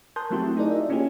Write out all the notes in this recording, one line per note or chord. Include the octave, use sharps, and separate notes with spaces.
A#4 A5 C6 D#6 F#6 G6
F#3 A3 C4 E4 F#4 G4
D#4 G#4 A#4 D5 D#5
E5
A#3 C#4 E4 F4 G4 G#4